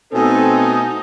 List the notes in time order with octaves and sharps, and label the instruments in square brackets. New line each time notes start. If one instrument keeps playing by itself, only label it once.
[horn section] B2 A3 G#5 [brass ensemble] C4 A4 [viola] D#4